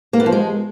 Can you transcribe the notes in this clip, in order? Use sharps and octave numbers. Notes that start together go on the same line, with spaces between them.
A#3
B3
F3
G#3